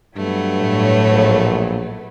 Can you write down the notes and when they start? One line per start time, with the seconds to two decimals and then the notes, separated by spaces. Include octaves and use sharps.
0.16 G2 F#3 A3 B3
0.59 A2 C#5
1.12 A#1